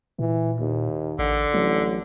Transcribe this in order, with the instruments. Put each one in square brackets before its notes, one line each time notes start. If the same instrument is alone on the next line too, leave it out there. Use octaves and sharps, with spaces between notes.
[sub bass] A#2 [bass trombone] E3
[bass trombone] D#2
[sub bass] A1 [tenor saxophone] D3
[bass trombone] A1 [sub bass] F#3